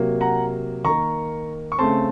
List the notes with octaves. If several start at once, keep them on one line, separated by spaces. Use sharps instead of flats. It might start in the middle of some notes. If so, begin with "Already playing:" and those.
Already playing: C3 F#3 A#3
F#5 A#5
D#3 A#3 A#5 C#6
C#6
C#3 A3 C4 A5 C6